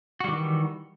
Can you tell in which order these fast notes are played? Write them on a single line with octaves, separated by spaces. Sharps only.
F#4 G3 D#3 E3